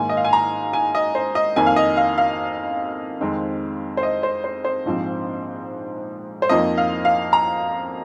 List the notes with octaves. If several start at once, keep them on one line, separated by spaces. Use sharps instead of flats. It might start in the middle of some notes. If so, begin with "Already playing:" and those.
Already playing: G#2 D#3 A#3 G#5
D#5
F5
G#5
A#5
G#5
D#5
C5
D#5
F2 D#3 A#3 G#5
F5
D#5
F5
F5
F2 D#3 G#3 C4
C5
D#5
C5
C5
C5
A#1 G#2 F3 C4
C5
F2 F3 A#3 D#4 D#5
F5
F5
A#5